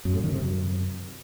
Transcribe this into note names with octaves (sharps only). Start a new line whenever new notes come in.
F#2
A2
D#3
C3
F#2